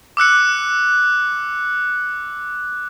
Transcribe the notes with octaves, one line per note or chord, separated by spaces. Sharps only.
D6 E6 F#6 C#7